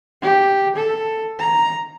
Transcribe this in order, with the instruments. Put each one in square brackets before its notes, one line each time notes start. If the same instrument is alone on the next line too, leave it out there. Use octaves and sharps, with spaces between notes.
[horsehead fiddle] G4
A4
A#5